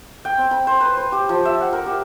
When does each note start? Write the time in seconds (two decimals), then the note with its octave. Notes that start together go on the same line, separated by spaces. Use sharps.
0.25 G5
0.37 C4
0.51 B5
0.67 C5
0.81 B4
0.97 C5
1.12 G4
1.29 F3
1.45 E5
1.61 F#5
1.73 A#4
1.86 G4